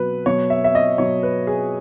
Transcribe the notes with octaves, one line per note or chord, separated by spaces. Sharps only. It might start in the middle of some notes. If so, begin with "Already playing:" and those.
Already playing: B2 F#3 B4
B2 F#3 C#5
E5
E5
D#5
B2 F#3 C#5
B4
G#4